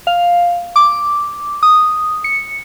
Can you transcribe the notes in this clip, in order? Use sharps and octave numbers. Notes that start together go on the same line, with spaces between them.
F5
D6
D#6
C#7